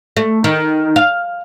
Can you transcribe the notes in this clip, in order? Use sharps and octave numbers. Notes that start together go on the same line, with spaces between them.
A3
D#3
F5